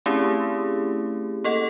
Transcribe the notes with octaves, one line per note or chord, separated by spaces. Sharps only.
A3 C4 C#4 E4 G4 G#4
A#3 A4 D#5 F#5